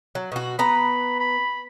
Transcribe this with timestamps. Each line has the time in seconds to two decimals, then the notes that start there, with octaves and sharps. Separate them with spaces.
0.15 F#3
0.32 B2 F#4
0.59 B3 B4 A#5 B5
1.20 B5